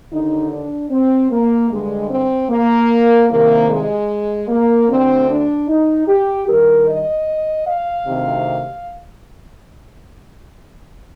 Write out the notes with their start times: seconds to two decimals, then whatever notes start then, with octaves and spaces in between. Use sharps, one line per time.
0.11 D#2 D3 D#4
0.51 D4
0.90 C4
1.30 A#3
1.70 G2 D3 G#3
2.10 C4
2.49 A#3
3.29 C2 C3 D#3 A#3
3.69 G#3
4.48 A#3
4.89 D2 D3 C4
5.28 D4
5.68 D#4
6.08 G4
6.47 G2 D#3 A#4
6.87 D#5
7.66 F5
8.07 D2 C3 D#3